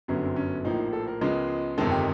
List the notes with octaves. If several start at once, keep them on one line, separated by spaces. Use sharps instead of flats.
G1 F#2 D3 F#3 B3 C#4
C4
C#4
A#1 A2 F3 A#3 D#4
A4
A#4
C#2 C#3 F3 G#3 B3
G1 F2 C3 D#3 G#3 A4
G4